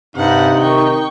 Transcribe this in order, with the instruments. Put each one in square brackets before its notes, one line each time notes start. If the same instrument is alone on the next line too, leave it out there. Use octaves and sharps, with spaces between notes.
[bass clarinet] G2 [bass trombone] C3 [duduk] D#4 [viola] F#5
[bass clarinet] D#3 [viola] G5 C#6